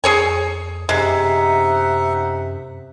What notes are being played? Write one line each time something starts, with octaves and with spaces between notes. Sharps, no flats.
F2 G#4 C#5 G#5
F#2 C3 G#3 D#4 E5 F#5